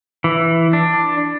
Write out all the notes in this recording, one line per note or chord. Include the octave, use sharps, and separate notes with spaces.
E3
D4